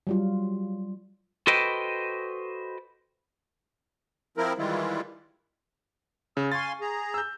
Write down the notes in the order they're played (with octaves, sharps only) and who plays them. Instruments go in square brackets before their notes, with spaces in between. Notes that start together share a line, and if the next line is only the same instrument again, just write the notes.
[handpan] F#3 G3 F4
[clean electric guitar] F#4 A4 B4 C5 D#5 G5
[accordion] F3 C4 E4 A#4
D#3 E3 G3 G#3 E4 F4
[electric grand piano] C#3 [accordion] E6
[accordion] F5 G#5 C6 [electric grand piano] C#6 A6
[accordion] G#4 A#5
[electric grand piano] E6 G6